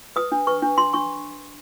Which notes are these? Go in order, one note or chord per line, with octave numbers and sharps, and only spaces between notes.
B4 D#6
D4
B4 C#6
D4
D4 C6
D4 C#6